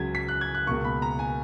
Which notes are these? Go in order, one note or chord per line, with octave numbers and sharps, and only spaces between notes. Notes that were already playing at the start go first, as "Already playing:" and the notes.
Already playing: C#2 C#3 F#3 C#4 G#6 B6
B6
F#6
G#6
F#6
C#2 B2 A#3 C#6
B5
A#5
G#5